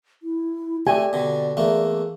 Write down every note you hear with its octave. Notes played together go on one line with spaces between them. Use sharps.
E4
A3 G4 D5 G#5
B2 D3
E2 A3 A#3